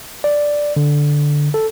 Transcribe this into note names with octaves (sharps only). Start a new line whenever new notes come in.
D5
D3
A4